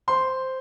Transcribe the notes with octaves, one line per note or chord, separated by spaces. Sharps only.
C5 C6